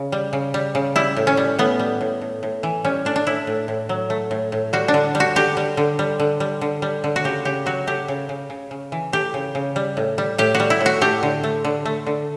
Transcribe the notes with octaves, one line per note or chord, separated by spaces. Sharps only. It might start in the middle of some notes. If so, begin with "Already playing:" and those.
Already playing: C#3
G3
C#3
G3
C#3
G3 E4
A2
C#4
G3
A2 B3
G3
A2
A2
A2
E3
G3 C#4
A2 D4
D4
A2 E4
A2
A2
F#3
A3
A2
A2
G3 F#4
D4
D3
G3
F#4
D3 G4
G3
D3
G3
D3
G3
D3
G3
D3
F#4
C#3 G4
C#3 G4
F#3 F#4
A3 G4
C#3
C#3
C#3
C#3
E3
A3 G4
C#3
C#3
G3
A2
G3
A2 G4
F#4
G3
E4
A2
F#4
A3 G4
D3
A3
D3
A3
D3